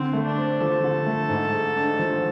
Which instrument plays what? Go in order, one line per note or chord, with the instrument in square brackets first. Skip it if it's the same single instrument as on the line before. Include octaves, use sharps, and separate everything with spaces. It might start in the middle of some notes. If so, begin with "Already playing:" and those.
Already playing: [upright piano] D3 [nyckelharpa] C4
[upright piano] A3
[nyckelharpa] D4
[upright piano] C4
[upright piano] F3 [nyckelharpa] A4
[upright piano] D3
A3
G#2
G#3
D4
F3